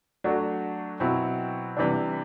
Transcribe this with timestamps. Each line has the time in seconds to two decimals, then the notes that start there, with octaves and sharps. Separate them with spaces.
0.24 F#3 A3 D4 F#4
1.00 B2 F#3 C4 E4
1.77 C3 E3 G3 D4